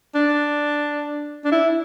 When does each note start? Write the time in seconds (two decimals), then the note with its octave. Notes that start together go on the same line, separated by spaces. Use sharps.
0.15 D4
1.44 D4
1.52 E4